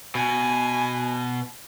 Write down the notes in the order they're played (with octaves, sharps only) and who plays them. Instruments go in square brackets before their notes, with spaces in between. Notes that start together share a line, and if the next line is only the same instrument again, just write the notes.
[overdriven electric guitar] B2 [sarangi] G#5